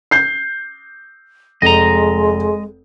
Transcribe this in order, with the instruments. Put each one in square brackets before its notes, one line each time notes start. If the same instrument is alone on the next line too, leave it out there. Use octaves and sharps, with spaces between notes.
[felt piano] G6 C7
[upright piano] F1 [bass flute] G#3 [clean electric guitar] D#5 A#5